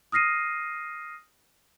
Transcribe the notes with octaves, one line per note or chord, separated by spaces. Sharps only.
D#6 F6 A#6 C7 D#7